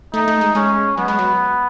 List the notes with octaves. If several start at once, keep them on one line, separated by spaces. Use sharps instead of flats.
A3 D#4
A3
G#3
G#3 C#4
F#3 B3
G#3
F#3